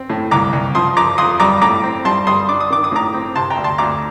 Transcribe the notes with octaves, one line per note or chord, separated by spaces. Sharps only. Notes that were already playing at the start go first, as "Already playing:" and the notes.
Already playing: C4
A2
C2 A#5 D6
C2
F3 C6 D#6
F3 A#5 D6
F2 C6 D#6
G3 A#5 D6
A2 A#5 D6
C4
G3 A5 C6
G3 C6 D#6
D4 D6
D#6
D#3 D6
D#6
A2 A#5 D6
C4
C3 A5 C6
G5 A#5
D2
A5 C6
D2 A#5 D6